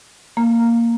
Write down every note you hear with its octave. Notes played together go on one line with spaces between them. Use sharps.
A#3